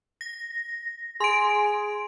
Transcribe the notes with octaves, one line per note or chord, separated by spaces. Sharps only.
A#6
G#4 C6 D7